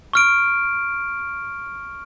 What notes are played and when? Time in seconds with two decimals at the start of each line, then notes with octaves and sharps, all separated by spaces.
0.13 C#6 F6 D7